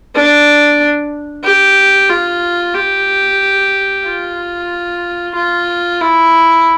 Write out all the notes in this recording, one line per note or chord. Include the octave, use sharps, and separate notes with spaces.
D4
G4
F4
G4
F4
F4
E4